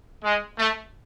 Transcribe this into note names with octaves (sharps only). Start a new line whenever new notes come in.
G#3
A3